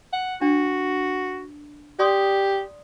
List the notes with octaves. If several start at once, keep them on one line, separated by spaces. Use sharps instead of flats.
F#5
D4 F#4
G4 D5 C6 D#6